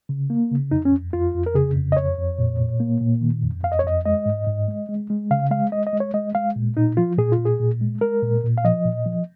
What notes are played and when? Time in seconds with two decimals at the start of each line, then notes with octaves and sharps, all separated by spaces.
0.09 C#3
0.30 A#3
0.51 C#3
0.71 F2 D#4
0.85 C#4
0.92 F2
1.13 F2 F4
1.34 F2
1.46 A#4
1.55 C#3 G#4
1.76 F2
1.92 D#5
1.97 F2 C#5
2.18 F2
2.38 A#2
2.59 A#2
2.80 A#3
3.01 A#2
3.22 D#3
3.43 F2
3.64 F2 F5
3.72 D#5
3.79 C#5
3.84 F2 D#5
4.06 G#3 D#5
4.26 G#2
4.47 G#2
4.68 G#3
4.89 G#3
5.10 G#3
5.31 C#3 F5
5.51 G#3 F5
5.72 G#3 D#5
5.87 D#5
5.93 G#3
6.00 C#5
6.14 G#3 D#5
6.35 G#3 F5
6.56 A#2
6.77 A#2 D#4
6.97 F3 F4
7.18 A#2 G#4
7.32 F4
7.39 A#2
7.45 G#4
7.60 A#2
7.81 G#3
8.01 G#3 A#4
8.22 A#2
8.44 A#2
8.58 F5
8.65 F3 D#5
8.85 A#2
9.06 F3